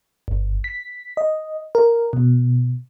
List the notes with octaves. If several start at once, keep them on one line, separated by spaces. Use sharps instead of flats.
G1
B6
D#5
A#4
B2